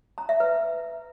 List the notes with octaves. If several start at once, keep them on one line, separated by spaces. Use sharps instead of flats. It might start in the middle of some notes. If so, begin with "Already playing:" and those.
A#5
E5
B4